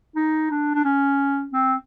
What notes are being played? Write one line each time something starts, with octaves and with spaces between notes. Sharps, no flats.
D#4
D4
D4
C#4
C4